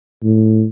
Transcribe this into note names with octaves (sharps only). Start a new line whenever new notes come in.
A2